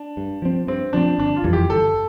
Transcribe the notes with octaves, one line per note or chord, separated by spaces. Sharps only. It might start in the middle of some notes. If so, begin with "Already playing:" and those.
Already playing: D4
G2
F3 C4
G2 C4
F3 C4 D4
G1 D4
F4
F2 E3 G3
G4
G1 A4